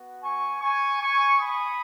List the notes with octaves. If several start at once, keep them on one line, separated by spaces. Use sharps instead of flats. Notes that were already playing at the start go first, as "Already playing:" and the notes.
Already playing: B3 F#4
G#5 C#6
G#5 C#6
G#5 C#6
B5 D#6